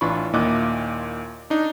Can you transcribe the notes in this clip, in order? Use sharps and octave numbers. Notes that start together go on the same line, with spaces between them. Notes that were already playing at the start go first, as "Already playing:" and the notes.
A1 E3 D4 F4 B5 C#6
D#2 A#2 E4 D#5 D6 F#6
D4 D#4